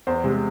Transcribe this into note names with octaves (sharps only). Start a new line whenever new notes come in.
E2 C5
C3 G#3